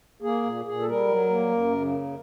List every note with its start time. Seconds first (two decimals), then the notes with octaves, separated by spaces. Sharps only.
0.22 A#3 G#4
0.43 A#2
0.65 A#2 G#4
0.80 A4
0.86 G3 A#4
1.08 F#3
1.29 A#3
1.51 F#2
1.72 C#3